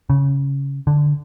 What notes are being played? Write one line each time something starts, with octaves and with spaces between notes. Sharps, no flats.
C#3
D3